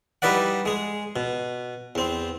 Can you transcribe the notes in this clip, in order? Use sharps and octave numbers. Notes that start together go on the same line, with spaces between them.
G3 D#4 E4 B4 D5 F#5
G#3 G#4
B2
E2 C4